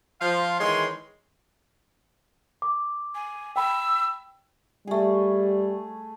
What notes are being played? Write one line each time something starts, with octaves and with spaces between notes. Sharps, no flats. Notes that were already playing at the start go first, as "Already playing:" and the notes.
F3 F5 C6
D#3 E3 G#3 C#5 G#5 C6
D6
G#5
G5 B5 E6
G3 A3 G#4